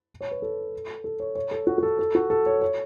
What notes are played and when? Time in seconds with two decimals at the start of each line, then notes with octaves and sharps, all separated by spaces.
0.21 C#5
0.31 B4
0.42 A4
1.04 A4
1.20 C#5
1.35 C#5
1.51 A4
1.67 F#4
1.78 F#4
1.83 A4
1.99 A4
2.15 F#4
2.30 A4
2.46 C#5
2.61 C#5